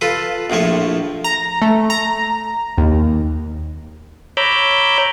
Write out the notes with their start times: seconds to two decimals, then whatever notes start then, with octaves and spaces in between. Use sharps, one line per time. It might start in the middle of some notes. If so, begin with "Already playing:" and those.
0.01 F4 A4 B4
0.50 A#1 A2 F3 C#5 C#6
1.24 A#5
1.62 A3
1.90 A#5
2.78 D#2
4.37 C#5 A#5 B5 D6 E6 G6